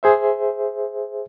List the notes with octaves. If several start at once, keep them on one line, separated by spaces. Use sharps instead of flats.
G#4 C5 E5